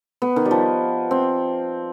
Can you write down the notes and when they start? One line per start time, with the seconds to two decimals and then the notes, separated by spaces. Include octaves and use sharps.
0.22 B3
0.36 D#3
0.46 G3
0.51 F3
1.11 C4